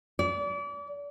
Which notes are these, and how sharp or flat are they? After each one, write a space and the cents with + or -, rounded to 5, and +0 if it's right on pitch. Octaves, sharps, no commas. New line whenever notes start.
D5 -35